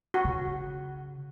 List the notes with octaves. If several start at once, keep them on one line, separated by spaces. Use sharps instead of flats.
F#4
C#3